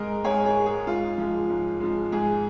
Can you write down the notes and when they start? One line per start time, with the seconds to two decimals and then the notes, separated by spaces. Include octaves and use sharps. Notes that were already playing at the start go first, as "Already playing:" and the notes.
Already playing: G#2 G#3 A#4 D#5
0.24 G#2 G#4 C#5
0.46 G#4
0.56 G#3
0.66 G#4
0.87 G#2 F4
1.18 F3 G#3
1.50 G#2
1.80 F3 G#3
2.12 G#2 G#4